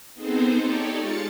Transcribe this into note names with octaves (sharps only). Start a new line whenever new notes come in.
B3 C4 D#4 G#4 A4 C5
D#4 G4 A4 C#5 D5
G#3 F4 A6 C#7